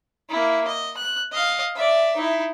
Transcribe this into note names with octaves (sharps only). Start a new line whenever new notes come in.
A#3 E4
D#5
F#6
D#5 F5
D5 E5
D#4 E4